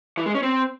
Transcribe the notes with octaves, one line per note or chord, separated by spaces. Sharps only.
E3
G#3
C#4
C4